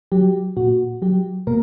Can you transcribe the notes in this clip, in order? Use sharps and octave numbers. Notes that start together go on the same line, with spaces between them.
F#3 G4
A#2 F#4
F#3 G4
B2 A#3 A#4